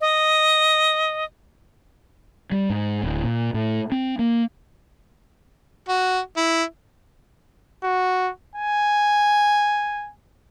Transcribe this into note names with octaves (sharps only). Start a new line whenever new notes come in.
D#5
G3
G#2
D1
A#2
A2
C4
A#3
F#4
E4
F#4
G#5